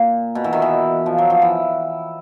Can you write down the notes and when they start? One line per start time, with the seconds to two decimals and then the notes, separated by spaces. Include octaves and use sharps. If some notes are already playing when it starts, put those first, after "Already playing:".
Already playing: A#2
0.35 B2
0.44 E3
0.53 D#3
0.62 E3
1.06 F3
1.18 F#3
1.30 F3
1.42 E3